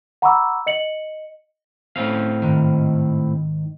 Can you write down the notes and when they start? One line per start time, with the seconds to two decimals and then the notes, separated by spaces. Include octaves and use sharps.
0.22 F#5 A#5 B5 C#6 D6 E6
0.66 D#5 C#7 F#7
1.96 A2 C4 C#4 F5
2.42 G#2 D#3